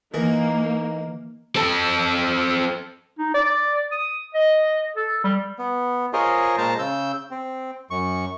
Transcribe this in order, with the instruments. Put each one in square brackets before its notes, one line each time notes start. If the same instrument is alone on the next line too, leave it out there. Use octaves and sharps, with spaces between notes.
[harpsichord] E3 G#4 A#4 [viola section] A#3 [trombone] D#4
[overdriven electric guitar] C4 A4
[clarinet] D#4
D5
D#6
D#5
A4
G3
[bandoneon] B3
F4 G#4 A#4 C5 C#5 D#5
A#2 G#3 C5 A5 A#5
C#3 E6 G6
C4
F#2 C#6